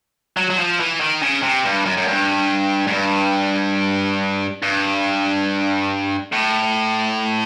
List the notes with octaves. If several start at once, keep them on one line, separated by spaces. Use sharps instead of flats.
F#3
F#3
F3
E3
D#3
C#3
C3
G2
F#2
F#2
G2
G#2
G2
G2
A2